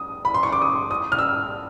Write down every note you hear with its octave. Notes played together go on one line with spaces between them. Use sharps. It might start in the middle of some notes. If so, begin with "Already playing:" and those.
Already playing: D#6
B5
C6
C#6
D6
D#6
D#6
F6
E6